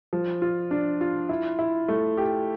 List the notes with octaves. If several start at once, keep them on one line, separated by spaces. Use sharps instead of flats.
F3
F4
D4
F4
E4
E4
A3
G4